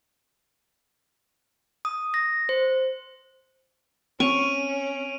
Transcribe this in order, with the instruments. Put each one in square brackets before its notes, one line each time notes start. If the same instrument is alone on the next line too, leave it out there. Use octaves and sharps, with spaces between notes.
[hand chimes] D#6
A#6
C5
[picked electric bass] C4 [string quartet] C#4 [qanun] C#6 [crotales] D7 D#7 F7